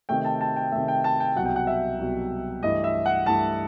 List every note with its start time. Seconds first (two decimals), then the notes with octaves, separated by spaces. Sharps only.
0.09 C3 D#3 A3 G5
0.24 A5
0.41 A5
0.56 G5
0.72 C3 D#3 A3 E5
0.88 G5
1.04 A5
1.20 G5
1.36 C2 B2 F#3 F#5
1.46 G5
1.56 F#5
1.67 E5
1.99 C2 B2 F#3
2.63 G2 E3 A3 D#5
2.84 E5
3.06 F#5
3.26 G2 E3 A3 A5